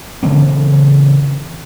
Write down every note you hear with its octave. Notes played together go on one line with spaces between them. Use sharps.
C#3 E3 B3 C4